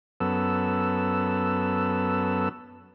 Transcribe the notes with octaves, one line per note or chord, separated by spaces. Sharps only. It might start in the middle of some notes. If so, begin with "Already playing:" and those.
F#2 B3 A4 E6